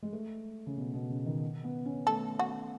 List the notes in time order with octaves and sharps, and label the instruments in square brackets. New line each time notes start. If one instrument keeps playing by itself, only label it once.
[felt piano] G#3
A3
C#3
B2
B2
C#3
D#3
B3
C#4
[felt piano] A3 [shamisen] A4
[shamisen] F#4